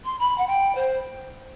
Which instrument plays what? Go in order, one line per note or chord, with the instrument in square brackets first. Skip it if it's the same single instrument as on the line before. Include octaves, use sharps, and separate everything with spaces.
[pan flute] C6
B5
F#5
G5
C5